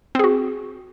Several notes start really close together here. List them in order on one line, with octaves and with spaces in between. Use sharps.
C4 G#4 F#4